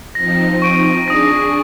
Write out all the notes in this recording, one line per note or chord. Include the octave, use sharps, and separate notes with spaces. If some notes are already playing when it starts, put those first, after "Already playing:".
F3 C4 D#4 A#6
C#6 D7 D#7
D4 G#4 D#6 A#6